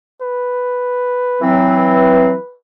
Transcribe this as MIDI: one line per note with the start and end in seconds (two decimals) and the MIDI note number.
0.21 2.56 71
1.41 2.33 52
1.41 2.33 54
1.41 2.33 60